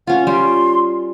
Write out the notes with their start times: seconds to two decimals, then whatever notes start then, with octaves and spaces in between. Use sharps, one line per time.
0.07 C#4 F4 F#5
0.27 G3 C6